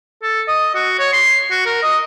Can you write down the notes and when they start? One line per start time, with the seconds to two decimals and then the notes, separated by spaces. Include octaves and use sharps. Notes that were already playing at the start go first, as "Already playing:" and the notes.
0.22 A4
0.48 D#5
0.75 F#4
0.99 C#5
1.13 C6
1.51 F#4
1.66 A#4
1.83 D#5